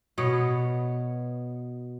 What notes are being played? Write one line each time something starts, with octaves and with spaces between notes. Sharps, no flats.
B2 B3 C#5